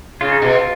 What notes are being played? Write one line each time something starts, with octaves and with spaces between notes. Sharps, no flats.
C#3 F4
D#4
B2 F4